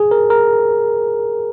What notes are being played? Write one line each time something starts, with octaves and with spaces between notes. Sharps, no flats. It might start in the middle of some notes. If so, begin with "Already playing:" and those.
Already playing: G#4
A#4
A#4